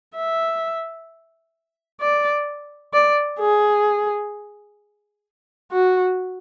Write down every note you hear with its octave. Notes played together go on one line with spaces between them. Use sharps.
E5
D5
D5
G#4
F#4